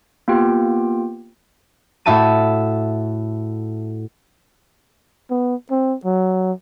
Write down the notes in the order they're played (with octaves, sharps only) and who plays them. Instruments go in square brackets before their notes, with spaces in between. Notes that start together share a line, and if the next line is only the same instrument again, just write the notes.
[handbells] A#3 B3 F4 G4 G5
[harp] A2 F#4 E5 A5 D#7
[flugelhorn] B3
C4
F#3